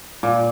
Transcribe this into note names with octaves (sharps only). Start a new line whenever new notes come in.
A#2